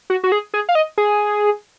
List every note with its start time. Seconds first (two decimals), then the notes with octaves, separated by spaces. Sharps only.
0.10 F#4
0.24 F#4
0.32 G#4
0.54 G#4
0.69 F5
0.75 D#5
0.98 G#4